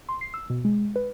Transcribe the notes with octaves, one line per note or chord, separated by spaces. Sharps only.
C6
C7
E6
B2
G#3
B4